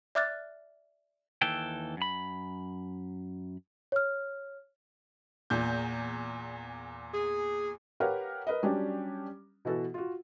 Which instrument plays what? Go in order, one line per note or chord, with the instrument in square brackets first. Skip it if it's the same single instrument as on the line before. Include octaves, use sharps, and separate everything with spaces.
[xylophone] D5 E5 D6 F6 F#6 A6
[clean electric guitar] D#2 E3 A4 G5
F#2 B5
[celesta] C#5 F6
[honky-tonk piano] E2 A#2 G6
[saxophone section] G#4
[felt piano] G4 A#4 B4 C#5 F5 F#5
A#4 B4 D#5
F#3 G3 C#4 D4 G4
B2 E3 F#4 A4
F4 F#4